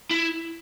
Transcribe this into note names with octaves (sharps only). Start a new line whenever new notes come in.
E4